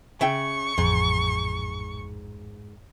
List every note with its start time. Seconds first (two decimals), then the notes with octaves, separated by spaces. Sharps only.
0.21 C#3 E5 G5 C#6
0.78 A1 F2 G#2